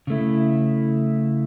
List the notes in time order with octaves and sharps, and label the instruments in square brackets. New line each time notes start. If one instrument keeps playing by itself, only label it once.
[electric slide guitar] C#3 A3 E4